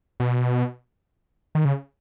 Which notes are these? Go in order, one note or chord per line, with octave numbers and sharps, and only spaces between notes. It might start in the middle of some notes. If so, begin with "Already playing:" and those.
B2
D#3
C#3